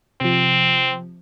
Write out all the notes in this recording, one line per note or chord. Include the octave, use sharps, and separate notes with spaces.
C3 F3 C4